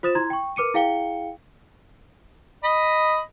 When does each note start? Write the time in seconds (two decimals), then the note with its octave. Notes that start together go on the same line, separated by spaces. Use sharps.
0.03 F4 C5 D#6 A6 E7
0.15 E4 A#5 C6 G#6
0.30 G5 C#6
0.56 A#4 B4 D6 C#7 D#7
0.74 E4 G#4 F5 G5 C#7 G7
2.64 D#5 B5